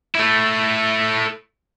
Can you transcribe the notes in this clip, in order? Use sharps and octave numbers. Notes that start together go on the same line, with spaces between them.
A3 E4